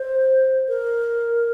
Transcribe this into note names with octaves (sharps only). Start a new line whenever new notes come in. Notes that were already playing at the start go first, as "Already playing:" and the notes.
Already playing: C5
A#4